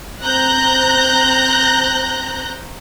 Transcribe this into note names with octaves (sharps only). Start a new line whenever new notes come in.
C4 A#5 F#6 G6 A#6